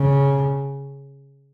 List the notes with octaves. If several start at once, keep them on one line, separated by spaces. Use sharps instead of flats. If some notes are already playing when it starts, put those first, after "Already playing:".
Already playing: C#3